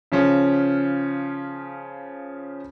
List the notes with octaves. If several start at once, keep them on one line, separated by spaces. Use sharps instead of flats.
C#3 F3 C#4